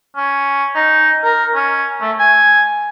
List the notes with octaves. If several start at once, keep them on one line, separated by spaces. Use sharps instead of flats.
C#4
D#4
A#4
C#4
A3
G#5